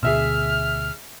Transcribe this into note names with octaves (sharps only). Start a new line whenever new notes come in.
D2 B2 G#4 E5 E6 F6